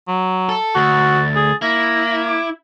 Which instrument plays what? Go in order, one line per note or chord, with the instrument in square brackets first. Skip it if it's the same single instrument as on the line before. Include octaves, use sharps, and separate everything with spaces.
[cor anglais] F#3
[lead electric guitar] A4
[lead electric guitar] D2 [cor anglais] F#4 [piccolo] A6
[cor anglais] G#4
[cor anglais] A#3 [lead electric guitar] E4 [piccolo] A#6
[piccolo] D6